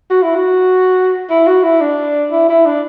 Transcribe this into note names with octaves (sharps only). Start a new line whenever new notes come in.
F#4
E4
F#4
E4
F#4
E4
D4
E4
E4
D4